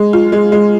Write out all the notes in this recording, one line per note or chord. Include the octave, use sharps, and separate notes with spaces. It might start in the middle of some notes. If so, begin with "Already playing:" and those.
Already playing: G#3
F4
G#3
G#3